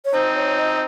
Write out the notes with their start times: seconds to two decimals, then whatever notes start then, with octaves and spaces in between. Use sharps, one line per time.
0.05 C#5
0.14 C4 D#4 C5
0.36 C#5
0.59 D#5